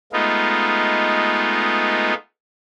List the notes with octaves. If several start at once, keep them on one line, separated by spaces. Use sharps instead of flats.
G#3 A3 B3 D#4 F4